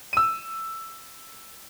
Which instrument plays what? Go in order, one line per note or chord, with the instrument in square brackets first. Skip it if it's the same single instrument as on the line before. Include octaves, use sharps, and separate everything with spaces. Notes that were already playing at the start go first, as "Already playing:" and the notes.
[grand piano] E6 D#7